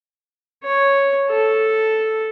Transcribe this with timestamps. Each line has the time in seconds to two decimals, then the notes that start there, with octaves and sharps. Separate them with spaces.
0.64 C#5
1.30 A4